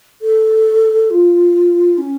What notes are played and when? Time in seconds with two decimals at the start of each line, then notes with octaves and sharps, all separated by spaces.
0.22 A4
1.10 F4
1.98 C#4